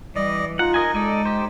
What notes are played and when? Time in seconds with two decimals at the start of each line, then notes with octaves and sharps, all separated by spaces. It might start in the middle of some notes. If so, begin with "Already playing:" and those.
0.16 E3 G3 D5 D#5
0.59 D#4 F4 F#5
0.74 A#4 D#5 G#5
0.95 G#3 A4 D5 D#5
1.25 G4 C5